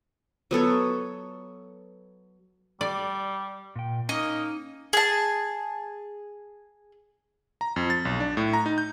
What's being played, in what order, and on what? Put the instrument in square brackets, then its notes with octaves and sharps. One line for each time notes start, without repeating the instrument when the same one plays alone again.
[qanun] F#3 B3 A4 C#5
[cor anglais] G3 [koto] D5
[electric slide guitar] A#2 G5
[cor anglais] A#3 [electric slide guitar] C#4 D#4 [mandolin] D#5
[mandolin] G#4 A5
[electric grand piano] A#5
F2
A6
B1
D4
A2
A#5
D#4
G6